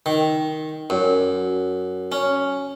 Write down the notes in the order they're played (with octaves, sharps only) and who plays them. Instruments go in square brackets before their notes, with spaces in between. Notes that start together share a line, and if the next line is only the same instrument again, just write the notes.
[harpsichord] D#3
F#2
C#4